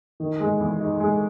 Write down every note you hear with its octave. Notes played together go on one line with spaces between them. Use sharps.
D#3
G#3
E2
D#4
G#3